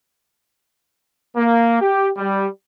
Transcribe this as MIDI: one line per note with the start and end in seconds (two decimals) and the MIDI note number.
1.37 1.80 58
1.81 2.08 67
2.17 2.47 55